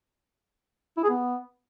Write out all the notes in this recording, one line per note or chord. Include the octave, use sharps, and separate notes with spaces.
E4
G#4
B3